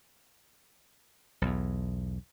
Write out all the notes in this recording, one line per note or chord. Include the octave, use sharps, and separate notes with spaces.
B1 E2